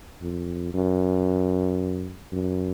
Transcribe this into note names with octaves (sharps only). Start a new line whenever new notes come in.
F2
F#2
F#2